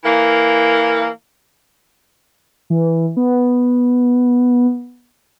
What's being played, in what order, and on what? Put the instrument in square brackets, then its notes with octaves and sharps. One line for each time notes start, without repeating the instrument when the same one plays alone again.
[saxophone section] E3 A#3
[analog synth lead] E3
B3